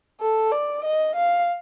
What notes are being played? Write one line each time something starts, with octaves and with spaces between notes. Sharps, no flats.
A4
D5
D#5
F5